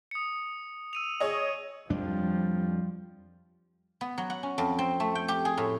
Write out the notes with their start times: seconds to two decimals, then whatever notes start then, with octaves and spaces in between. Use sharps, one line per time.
0.11 D#6 C#7
0.93 E6 D#7 F7
1.20 G#4 C#5 D#5
1.90 F2 F3 G3 D4
4.01 B3
4.18 F#3
4.30 F#5
4.43 C#4
4.58 F2
4.79 C4
5.00 A3
5.15 G5
5.28 G4
5.45 G#4
5.57 A2